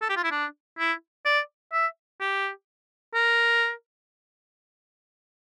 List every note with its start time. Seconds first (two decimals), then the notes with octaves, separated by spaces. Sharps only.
0.02 A4
0.09 G4
0.17 F4
0.24 E4
0.31 D4
0.79 E4
1.26 D5
1.73 E5
2.21 G4
3.14 A#4